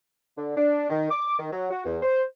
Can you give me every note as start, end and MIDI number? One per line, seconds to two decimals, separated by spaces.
0.38 0.53 50
0.57 0.86 62
0.90 1.11 51
1.11 1.35 86
1.38 1.49 51
1.52 1.67 54
1.71 1.85 66
1.86 1.97 40
2.02 2.23 72